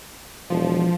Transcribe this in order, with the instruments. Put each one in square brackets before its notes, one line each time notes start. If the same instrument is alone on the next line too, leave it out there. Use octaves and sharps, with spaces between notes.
[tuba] E1 [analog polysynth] F3